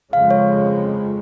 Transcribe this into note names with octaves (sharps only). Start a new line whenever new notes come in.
F2 C#3 F3 G#3 F5
C#5